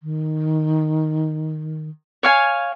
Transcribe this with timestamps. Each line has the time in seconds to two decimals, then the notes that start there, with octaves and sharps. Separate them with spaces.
0.03 D#3
2.23 C#5 F5 G#5